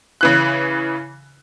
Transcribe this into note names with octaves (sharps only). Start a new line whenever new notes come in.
C#3 E3 F#6